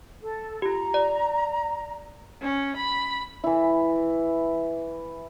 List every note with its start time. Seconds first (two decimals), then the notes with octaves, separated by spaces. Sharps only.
0.22 A4
0.62 F4 G4 A#5
0.94 D5
2.42 C#4
2.77 B5
3.44 E3 E4